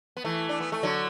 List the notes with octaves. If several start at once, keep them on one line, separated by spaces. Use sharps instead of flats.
B3
E3 A3
D4
B3
A3
D3 F#3